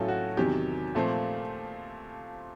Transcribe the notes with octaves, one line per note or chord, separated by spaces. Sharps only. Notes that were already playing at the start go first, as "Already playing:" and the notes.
Already playing: A2 F#3 A3 C#4 F4 A4
F#4
E2 C3 D#3 F#3 G4
A#2 F3 A3 C4